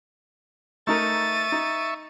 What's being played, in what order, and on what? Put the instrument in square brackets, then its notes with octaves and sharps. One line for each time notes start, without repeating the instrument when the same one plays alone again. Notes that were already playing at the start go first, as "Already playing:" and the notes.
[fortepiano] A3 D#4 A#4 [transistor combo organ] E5 C#6 [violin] A6 D#7
[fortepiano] D#4